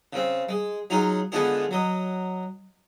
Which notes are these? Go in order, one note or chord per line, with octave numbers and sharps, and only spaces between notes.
C#3 C4
G#3
F#3 D#4 F4 G#4
D3 G#3 B3 D4 F4 G#4
F#3 D#5